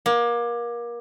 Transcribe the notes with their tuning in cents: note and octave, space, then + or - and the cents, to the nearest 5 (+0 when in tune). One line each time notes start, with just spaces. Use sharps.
A#3 +30